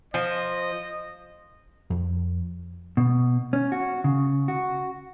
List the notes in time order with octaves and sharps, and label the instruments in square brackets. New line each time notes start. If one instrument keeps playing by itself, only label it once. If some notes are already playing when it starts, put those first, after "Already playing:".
[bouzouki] F3 [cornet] D#5
[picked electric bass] F2
[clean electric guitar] B2
C#4
F#4
C#3
F#4